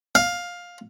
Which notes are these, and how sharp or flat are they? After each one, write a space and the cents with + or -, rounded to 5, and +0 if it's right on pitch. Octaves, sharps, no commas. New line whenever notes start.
F5 +10